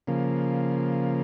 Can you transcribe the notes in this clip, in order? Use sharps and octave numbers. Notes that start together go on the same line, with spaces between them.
C#3 F3 A#3